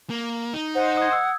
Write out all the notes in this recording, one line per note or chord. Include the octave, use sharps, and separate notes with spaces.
A#3
D#4
C5 D#5 F#5
D#6 G#6
E6